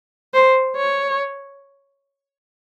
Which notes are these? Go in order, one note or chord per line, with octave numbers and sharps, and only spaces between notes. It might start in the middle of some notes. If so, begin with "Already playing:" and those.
C5
C#5